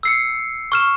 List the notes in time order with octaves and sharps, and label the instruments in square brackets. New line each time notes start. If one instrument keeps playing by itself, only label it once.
[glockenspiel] E6 C7 C#7
C#6 F6 E7